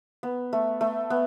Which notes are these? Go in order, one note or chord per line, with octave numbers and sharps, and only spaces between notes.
B3
A3
A3
B3